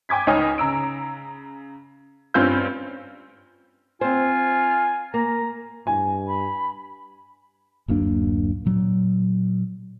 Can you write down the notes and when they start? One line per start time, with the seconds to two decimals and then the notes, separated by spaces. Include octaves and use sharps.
0.09 G5 G#5 D6 G#6 B6
0.27 C#2 D#4 C#5 G#5 D#6 F6
0.58 C#3 A#5 E6 D7
2.34 G2 C4 C#4 F4 E6 G6
4.01 C4 F4 C5 G#5
5.14 A#3 A#5
5.87 G2 G#5
6.27 B5
7.88 D1 F#2 A#3 D4
8.66 A#2 F#3